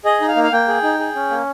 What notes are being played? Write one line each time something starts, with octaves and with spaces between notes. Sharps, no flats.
G#4 D#5
D#4
F5
A#3
F5
A#3 G5
G#4
D#4
G#4
C#4
A#3